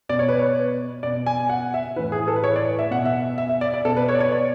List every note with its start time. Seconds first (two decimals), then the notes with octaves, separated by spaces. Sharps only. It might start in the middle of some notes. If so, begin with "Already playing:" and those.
0.09 B2 D5
0.19 C#5
0.29 B4
0.39 C#5
1.03 B2 D5
1.26 G#5
1.50 F#5
1.74 E5
1.96 A2 E3 B4
2.12 G#4
2.28 A4
2.36 B4
2.44 C#5
2.56 D5
2.79 E5
2.90 B2 F#5
3.05 E5
3.38 E5
3.50 E5
3.61 D5
3.74 D5
3.85 B2 A4
3.97 B4
4.09 C#5
4.15 D5
4.20 C#5
4.32 D5